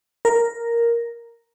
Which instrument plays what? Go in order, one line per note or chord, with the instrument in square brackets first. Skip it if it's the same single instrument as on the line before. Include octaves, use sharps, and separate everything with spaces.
[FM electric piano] A#4